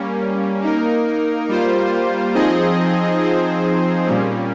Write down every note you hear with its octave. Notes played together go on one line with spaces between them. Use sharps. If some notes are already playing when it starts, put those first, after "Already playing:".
Already playing: G3 A#3 C#4
A#3 D#4 A#4
G3 A#3 F4 C5
F3 C4 D#4 G#4 D#5
F3 C4 D#4 G#4 C5
A#2 G3 A#3 C#4